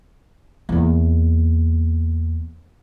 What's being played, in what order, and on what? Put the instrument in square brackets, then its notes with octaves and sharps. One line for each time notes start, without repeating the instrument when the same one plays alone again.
[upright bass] E2 A#3